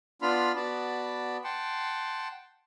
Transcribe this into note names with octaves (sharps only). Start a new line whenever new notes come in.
B3 D4 F4 B5 C6 F6
B3 F#4 D5 A5 B5
F#5 G5 A5 C6